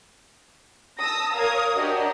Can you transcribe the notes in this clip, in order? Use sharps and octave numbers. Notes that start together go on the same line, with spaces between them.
A5 D#6 E6 A#6
A#4 C#5 F5 D#6 G#6
D4 F#4 G4 A#4 D5 D#5